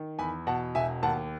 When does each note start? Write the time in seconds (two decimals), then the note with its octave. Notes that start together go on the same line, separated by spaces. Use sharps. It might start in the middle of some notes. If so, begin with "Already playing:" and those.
Already playing: D#3
0.19 E2 G#5 B5
0.47 B2 F#5 A5
0.75 E1 E5 G#5
1.03 D#2 F#5 A5